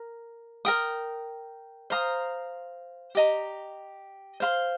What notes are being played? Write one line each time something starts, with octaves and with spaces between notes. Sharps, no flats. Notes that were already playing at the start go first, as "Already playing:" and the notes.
Already playing: A#4
A#4 G5 D#6
C5 F5 A#5 D#6
G4 D#5 A#5
C5 F5 C6